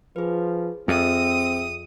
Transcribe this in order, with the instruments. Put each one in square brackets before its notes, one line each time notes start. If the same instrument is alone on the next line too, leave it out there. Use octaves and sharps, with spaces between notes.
[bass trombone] F3 [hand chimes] G#4 B4
[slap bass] F2 [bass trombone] C4 [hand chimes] G#4 E5 E6 [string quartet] D#6